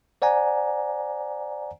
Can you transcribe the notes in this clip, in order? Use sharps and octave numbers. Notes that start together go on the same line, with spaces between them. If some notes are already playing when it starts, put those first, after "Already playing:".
C5 D5 F#5 G#5 A#5